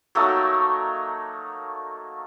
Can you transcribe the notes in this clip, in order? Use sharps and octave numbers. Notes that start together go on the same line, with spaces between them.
F#3 A3 A#3 D#4